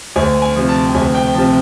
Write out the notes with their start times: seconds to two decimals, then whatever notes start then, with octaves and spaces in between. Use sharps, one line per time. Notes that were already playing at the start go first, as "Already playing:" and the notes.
0.16 D2 G#5
0.42 G#5
0.56 C3 F3
0.68 A5
0.86 G5
0.95 D2 G#5
1.15 G5
1.34 C3 F3 A5